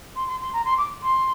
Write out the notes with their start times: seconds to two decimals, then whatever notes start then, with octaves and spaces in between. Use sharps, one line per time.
0.16 C6
0.28 C6
0.41 C6
0.53 A#5
0.65 C6
0.78 D6
1.03 C6